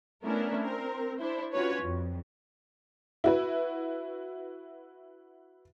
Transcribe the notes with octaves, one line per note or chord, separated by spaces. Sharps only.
A3 B3 C#4 D4 E4 A#4
C4 A#4
D4 E4 C5
C#4 F4 F#4 B4 C#5
F2
E4 F#4 B4